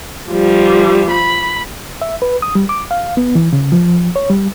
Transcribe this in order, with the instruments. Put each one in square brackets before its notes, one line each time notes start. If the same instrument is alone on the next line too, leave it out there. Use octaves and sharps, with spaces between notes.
[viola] F3 G3
B5
[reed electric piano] E5
B4
D#6
G3
D6
F5
B3
E3
C#3
F3
C#5
G3